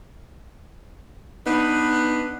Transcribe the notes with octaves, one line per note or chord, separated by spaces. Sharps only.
B3 D4 D#4 B4